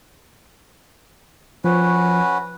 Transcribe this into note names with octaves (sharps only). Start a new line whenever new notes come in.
F3 C#4 F#4 B4